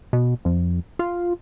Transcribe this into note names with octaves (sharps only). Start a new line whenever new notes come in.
B2
F2
F4